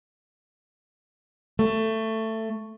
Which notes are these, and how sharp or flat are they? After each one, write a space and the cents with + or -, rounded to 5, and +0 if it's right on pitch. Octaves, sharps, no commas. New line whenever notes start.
A3 +15